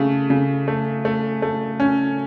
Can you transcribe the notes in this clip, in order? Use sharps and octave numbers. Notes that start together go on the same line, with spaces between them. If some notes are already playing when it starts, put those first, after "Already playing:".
Already playing: C#3 A3
C#3
A3
A3
A3
C#4